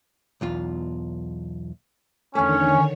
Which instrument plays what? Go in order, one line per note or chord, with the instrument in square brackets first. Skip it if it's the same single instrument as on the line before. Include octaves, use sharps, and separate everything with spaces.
[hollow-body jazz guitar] B1 E2 F4
[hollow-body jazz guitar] E2 A3 [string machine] D3 D#3 C#5 [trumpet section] C#4